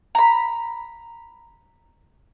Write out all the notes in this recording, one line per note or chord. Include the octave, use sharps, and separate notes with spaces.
A#5 B5